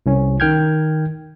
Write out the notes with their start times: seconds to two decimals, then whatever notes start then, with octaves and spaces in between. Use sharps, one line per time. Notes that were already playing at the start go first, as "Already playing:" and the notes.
0.06 C2 C#4
0.40 D#3 G5 F6 G6 G#6